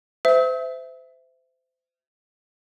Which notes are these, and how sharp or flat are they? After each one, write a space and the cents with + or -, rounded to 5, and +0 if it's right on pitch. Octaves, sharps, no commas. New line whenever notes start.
C5 -30 E5 +5 E6 -45